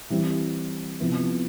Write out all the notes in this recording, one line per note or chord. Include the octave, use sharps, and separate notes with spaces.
E3 G3 C4 E4
C3 F3 B3 E4